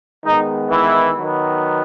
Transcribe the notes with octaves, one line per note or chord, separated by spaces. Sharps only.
D#3 G#3 B3 D#4
E3 E4
D#3 F#3 B3